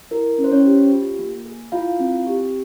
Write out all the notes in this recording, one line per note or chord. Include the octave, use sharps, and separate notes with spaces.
E4 A#4
C#4
C5
C#4 C#5
G4
F4
A#3
G#4
E4 F4 F5
C4
G4